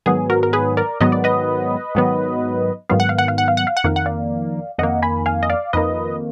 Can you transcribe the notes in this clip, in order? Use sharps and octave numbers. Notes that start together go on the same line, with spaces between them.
G#2 D#3 F#3 B3 G#4
F#4 A#4
A#4
G#4 B4
A#4 D5
G#2 D#3 F#3 B3 D#5
D5
B4 D#5
G#2 D#3 F#3 B3
G#2 D#3 F#3 B3 F5
F#5
F5
F#5
F5
F#5
F5
F#5
F5
F#5
F2 D#3 A#3 F5
F#5
D5 F5
F2 D#3 A#3 D#5 F#5
G#5 B5
F5 G#5
D#5
D5 F5
F2 D#3 A#3 B4 D#5